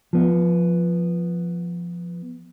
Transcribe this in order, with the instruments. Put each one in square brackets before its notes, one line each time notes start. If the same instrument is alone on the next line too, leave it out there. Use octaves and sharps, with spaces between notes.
[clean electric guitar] F3 B3